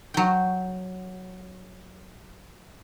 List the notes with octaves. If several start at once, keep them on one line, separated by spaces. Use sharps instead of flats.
F#3 G5